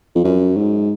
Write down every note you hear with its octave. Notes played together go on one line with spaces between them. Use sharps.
F2
F#2
G#2